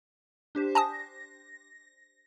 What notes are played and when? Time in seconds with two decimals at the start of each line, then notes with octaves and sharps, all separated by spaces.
0.55 D4 G4 C5
0.75 G#5 A5 D#6 A#6